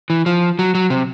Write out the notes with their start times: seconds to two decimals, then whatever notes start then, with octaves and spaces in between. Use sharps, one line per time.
0.10 E3
0.26 F3
0.59 F#3
0.75 F#3
0.90 C3